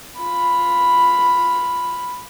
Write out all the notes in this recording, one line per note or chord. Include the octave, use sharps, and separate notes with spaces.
F4 B5